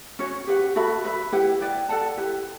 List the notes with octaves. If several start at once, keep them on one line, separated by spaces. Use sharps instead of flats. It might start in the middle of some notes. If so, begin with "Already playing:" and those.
C#4 F#4 C#5
G4 B4 F#5
F#4 A4 E5 B5
B4 E5 B5
E4 G4 B4 F#5
E4 B4 D5 G5
A4 D5 F#5 A5
E4 G4 B4